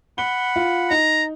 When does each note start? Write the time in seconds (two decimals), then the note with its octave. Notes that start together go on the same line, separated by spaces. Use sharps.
0.18 F#5 B5 G7
0.56 F4
0.91 D#4 A#5